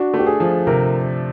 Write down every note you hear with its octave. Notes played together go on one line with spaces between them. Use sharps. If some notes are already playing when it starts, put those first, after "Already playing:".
Already playing: D4 F#4
A3 G4
G#4
F3
C3 A#4